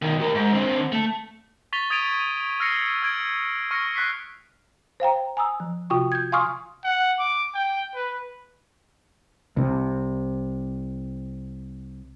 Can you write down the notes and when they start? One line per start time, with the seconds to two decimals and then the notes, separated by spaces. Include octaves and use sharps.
0.02 B2 D#3
0.20 G4 A#4
0.35 G#2
0.53 D3 C4
0.92 A3
1.73 C#6 A6 B6 F7 G7
1.90 D#6 G#6 A6 D7 D#7 F7
2.60 E6 F6 G#6 A#6 C7 C#7
3.02 E6 G#6 D7
3.71 C#6 F6 A#6 C#7
3.95 C#6 F#6 B6 C7
5.00 C5 F5 G5 A#5
5.37 G#5 A#5 D#6 E6
5.60 F3
5.90 C3 F4 F#4 G5 C#6
6.12 G6 G#6
6.32 F5 G#5 C6 C#6 D#6 F6
6.84 F#5
7.19 D6
7.54 G5
7.95 B4
9.57 C2 C3